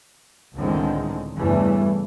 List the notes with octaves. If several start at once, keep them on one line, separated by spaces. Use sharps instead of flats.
C#2 A2 D3 D#3 G#3 C4
E2 G2 C#3 E3 G3 A3